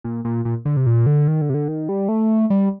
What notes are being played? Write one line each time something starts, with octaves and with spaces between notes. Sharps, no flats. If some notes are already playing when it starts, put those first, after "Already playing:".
A#2
A#2
A#2
D3
C3
A#2
D3
D#3
D3
C3
D3
D#3
G3
A3
G3